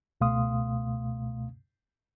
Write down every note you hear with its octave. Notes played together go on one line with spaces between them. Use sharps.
C#2 B2 A3 F5 C6 D#6